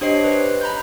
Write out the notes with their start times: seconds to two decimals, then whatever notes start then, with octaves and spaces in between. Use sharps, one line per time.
0.01 D4 G4 C5 C#5 D#5 C7
0.24 B4
0.61 A#5 B5 G6